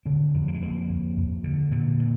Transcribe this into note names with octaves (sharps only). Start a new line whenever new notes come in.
D3 C4
F2
A#3
G#3
F2 A#3
F2
F2
D3
A#2 D3
A#2